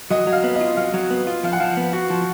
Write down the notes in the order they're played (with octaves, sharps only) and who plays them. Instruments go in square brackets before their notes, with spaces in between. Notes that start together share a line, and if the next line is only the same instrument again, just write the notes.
[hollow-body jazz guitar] F#3 [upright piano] D#5
[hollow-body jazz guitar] F#3
[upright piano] F5
[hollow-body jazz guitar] B3
[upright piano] D#5
[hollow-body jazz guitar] F4
[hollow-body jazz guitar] F#3 [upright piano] F5
[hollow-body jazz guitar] F#3
B3
F4
[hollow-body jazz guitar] F3 [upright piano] F5
[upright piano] F#5
[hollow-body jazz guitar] F3 [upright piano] F5
[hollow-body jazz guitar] B3
F#4
F3